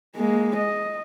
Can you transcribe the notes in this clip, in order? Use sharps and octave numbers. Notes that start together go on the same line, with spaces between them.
G#3 A#3
D#5